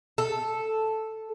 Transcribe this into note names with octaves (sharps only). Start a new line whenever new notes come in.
A4